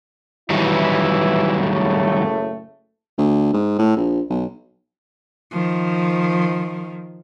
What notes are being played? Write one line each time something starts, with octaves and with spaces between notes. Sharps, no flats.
D#3 E3 F#3 G3 E4
F#1 A2 A3
D2
G#2
A2
A#1
B1
D#3 F3